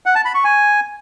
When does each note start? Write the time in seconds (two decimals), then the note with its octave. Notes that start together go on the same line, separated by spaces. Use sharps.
0.06 F#5
0.15 A5
0.25 B5
0.35 C#6
0.44 G#5